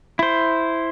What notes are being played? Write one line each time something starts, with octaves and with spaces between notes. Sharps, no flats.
E4 C5